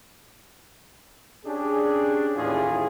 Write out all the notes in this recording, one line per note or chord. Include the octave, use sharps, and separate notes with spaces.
C#4 D4 G4 G#4
D#2 A2 E3 C#4 F4 G#4